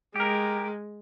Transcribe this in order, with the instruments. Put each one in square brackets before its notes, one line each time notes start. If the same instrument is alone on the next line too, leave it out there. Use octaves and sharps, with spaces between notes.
[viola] G#3 [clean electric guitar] G4 A#4